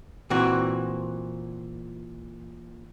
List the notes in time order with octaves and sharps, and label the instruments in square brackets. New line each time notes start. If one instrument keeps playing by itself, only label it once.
[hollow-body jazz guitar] A#2 E3 C4 F#4